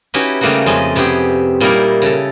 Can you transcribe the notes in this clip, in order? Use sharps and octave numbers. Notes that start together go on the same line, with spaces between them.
C#4 D#4 E4 F#4 G4 B4
C#3 G3 A3 A#3 D#4 F#4
F2 G#3 A3 C#4 D#5 A5
C3 B3 C#4 G4 G#4
A#2 G3 A#3 D#4 E4 A#4
C#3 A4